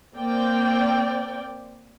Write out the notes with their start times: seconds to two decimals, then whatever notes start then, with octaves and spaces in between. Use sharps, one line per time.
0.15 A#3 C4 D5 G5